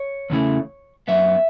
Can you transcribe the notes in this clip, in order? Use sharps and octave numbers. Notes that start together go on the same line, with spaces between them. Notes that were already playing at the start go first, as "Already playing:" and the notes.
Already playing: C#5
E2 C#3 E3 A3
F#2 F#3 B3 E5